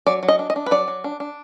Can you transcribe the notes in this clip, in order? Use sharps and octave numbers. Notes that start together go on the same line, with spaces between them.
F#3 D5
F#3
D#5
D4
D#5
D4
B4
F#3 D5
F#3
D4
D4